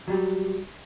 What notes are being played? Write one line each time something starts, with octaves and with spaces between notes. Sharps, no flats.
F#3 G3